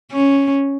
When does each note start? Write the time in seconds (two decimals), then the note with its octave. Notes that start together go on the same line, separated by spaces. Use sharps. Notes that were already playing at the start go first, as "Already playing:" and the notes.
0.12 C#4